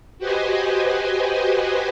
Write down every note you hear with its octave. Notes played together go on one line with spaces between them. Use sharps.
F#4 G4 B4 C5 D#5 G#5